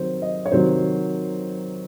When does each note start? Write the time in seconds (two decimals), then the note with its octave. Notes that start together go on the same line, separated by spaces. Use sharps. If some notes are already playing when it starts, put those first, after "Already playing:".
Already playing: C3 D#3 F#3 C5
0.22 D#5
0.46 C#5
0.52 C3 D#3 F#3 C5